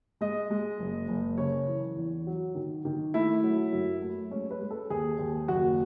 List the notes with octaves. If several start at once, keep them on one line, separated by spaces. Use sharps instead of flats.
G#3 D#5
G#3
F#1
F#1
C#3 C#5
E3
E2
F#3
D#3
D#3
A3 E4
F#3
F#2
A3
G#3 C#4
B4
G#3
A4
D#2 G#4
D#2
F#1 F#4